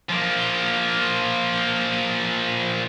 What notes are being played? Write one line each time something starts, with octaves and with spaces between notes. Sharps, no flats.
F3 A#3